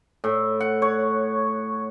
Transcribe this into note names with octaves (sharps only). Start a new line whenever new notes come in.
A2
F#5
C#5